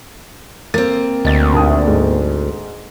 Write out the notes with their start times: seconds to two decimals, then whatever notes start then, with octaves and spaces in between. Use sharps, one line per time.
0.74 A#3 C4 A6
1.25 D2 D#5 A6
1.53 A#1 D#2 D#6
1.87 G#2